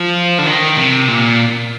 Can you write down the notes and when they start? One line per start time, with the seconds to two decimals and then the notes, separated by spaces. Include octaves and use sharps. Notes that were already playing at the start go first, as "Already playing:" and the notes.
Already playing: F3
0.39 D3
0.46 D#3
0.77 C3
1.08 A#2